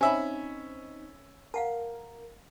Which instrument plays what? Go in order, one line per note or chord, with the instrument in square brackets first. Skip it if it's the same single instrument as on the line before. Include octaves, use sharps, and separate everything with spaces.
[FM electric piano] C4 D#4 [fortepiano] C#4 E5 B5 [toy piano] G#5
[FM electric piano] A#4 [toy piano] F5 F#5 A5